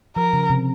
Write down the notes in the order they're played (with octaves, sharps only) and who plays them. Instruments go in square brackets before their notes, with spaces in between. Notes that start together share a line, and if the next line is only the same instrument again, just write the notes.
[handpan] F3 [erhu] A#4
[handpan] C#3
C3